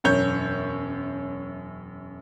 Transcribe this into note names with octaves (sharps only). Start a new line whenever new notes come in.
E1 F#2 C#5 G6